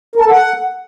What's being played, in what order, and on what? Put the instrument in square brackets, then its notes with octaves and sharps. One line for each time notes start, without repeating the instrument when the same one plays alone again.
[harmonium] A#4
A5
A4
F#5